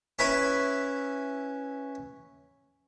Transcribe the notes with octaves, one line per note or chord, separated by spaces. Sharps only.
C#4 E4 B4 B5